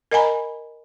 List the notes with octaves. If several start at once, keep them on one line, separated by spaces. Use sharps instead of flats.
A#4 D#5 F#5 G#5 A#5 B5